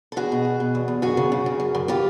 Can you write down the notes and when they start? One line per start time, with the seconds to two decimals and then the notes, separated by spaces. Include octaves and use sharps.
0.12 A4
0.16 E2 F#4 G#4
0.32 B2
0.45 E2
0.60 B2
0.75 E2
0.88 E2
1.02 F#2 F#4 G#4
1.17 C#3
1.32 C#3
1.46 C#3
1.60 F#2
1.75 F#2
1.88 E3 F4 G4